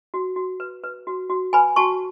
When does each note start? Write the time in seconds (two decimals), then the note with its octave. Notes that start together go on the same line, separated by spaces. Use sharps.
0.14 F#4
0.36 F#4
0.60 B4
0.84 B4
1.07 F#4
1.30 F#4
1.53 B4 G#5 B5
1.76 F#4 A5 C#6